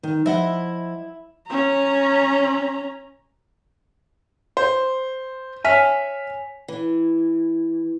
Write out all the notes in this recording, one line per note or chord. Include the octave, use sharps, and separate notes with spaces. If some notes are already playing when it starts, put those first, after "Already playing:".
D#3
F3 E4 D#5 F#5
C#4 A#5
C5
C#5 E5 G#5 F6 B6
E3